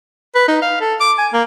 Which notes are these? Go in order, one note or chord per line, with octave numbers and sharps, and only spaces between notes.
B4
D#4
F5
A4
D6
G#5
A#3